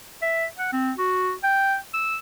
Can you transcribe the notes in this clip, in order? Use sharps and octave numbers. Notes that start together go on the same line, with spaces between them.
E5
F#5
C4
F#4
G5
E6